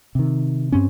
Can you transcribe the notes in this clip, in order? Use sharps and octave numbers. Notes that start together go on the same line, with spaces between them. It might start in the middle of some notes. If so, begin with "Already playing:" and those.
C3 D#3
G2 C4 C#4